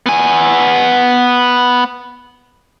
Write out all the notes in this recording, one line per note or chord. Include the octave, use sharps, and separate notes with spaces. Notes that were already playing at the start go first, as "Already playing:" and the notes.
B3 G#5